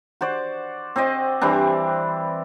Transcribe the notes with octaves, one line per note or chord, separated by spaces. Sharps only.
F#4 C5 D5
C4 C5 D5 D#5
E3 G3 C4 D4